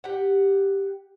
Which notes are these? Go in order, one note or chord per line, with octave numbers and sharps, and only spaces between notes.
G4 F#5